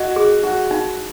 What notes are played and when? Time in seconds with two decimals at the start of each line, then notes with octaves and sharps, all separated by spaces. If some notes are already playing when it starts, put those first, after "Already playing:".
Already playing: F#4 D#5
0.16 G#4
0.43 D#4 F#4
0.71 D#4